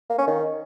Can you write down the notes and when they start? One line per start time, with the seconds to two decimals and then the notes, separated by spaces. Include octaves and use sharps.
0.10 A#3
0.18 C#4
0.27 D#3